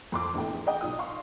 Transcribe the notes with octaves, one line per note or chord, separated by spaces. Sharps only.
F2 C6 D6
A#1 E2 A2 A4 G5
G#4
G#4 D5 D#5 F#5 G5
B1 F4 D#6
F5 C6 C#6